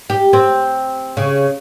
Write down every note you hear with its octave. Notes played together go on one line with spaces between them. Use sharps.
G4
C4
C#3